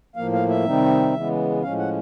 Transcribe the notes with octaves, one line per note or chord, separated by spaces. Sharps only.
A2 F3 A#3 F5
F5
E5
C3 D#3 G3 C4 D#4
C#3 E3 G#3 B3
A2 F3 G#3 C#4 F5
F#5